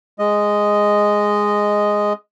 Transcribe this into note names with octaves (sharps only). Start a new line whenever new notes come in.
G#3 D#5